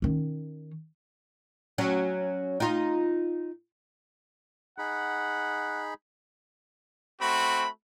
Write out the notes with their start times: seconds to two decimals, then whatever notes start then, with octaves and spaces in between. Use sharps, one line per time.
0.02 D#3 C#4
1.78 F#3 C#4
2.60 D#4 F4
4.78 D#4 G#4 F#5 B5
7.20 A3 C4 F#4 B5